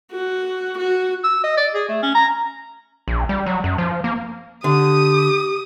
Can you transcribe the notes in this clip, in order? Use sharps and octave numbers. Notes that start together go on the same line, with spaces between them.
F#4
F#4
E6
D#5
D5
G#4
A3
C#4
A#5
A#1
G3
F#3
F#2
F3
A#3
D3 G4 D#6